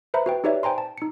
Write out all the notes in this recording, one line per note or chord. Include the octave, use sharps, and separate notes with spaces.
B4 C5 E5 A#5 B5
F#4 B4 G5
D#4 G4 B4 C#5 D5 E5
C5 G5 G#5 A#5 C6
A5
D#4 C#7